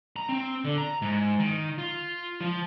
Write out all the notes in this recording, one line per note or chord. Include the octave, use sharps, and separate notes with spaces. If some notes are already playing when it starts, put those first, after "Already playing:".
A#5
C4
D3
A#5
G#2
D#3
F4
F3